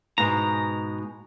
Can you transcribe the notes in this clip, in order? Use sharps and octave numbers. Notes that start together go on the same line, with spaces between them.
G#2 B2 G#3 A#5